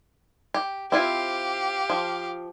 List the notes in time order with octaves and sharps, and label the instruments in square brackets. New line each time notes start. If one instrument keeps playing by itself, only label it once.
[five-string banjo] G4
[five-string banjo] C4 E4 F4 [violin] G4 F5
[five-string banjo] F3